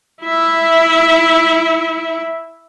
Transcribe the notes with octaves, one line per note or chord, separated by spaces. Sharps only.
E4 E5